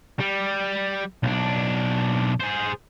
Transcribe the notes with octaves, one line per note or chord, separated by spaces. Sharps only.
G3
B1 D4
G#4 C5